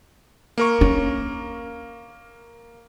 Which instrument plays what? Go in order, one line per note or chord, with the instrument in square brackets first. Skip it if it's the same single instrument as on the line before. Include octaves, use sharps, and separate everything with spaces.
[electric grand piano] A#3 A#4 C#6
[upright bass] C#4